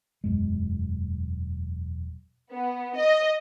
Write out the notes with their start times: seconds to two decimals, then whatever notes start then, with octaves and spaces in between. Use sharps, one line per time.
0.24 E1 F#2 G#3
2.51 B3
2.96 D#5